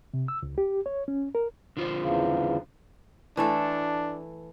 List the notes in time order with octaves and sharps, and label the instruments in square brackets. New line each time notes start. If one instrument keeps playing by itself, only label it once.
[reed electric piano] C3
E6
C#2
G4
C#5
C#4
A#4
[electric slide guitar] D3 F4 C5
[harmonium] E2 C#3
[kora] E3 A3 A4 [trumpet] D4